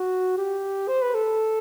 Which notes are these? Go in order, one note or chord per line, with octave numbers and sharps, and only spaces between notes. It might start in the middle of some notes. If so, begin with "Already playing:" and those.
Already playing: F#4
G4
C5
B4
A4